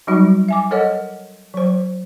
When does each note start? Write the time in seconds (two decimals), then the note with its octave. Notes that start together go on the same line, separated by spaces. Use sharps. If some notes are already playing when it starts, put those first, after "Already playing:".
0.07 F#3 G3 D#4 F#4
0.48 E5 G#5 D6
0.71 A4 A#4 C#5 D#5 F#5
1.54 F#3 C5